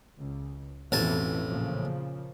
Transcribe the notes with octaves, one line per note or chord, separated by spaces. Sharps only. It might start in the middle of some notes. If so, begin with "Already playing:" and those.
C#2
A1 F2 B2 E3 G#5 A5
A#2 C#3 F3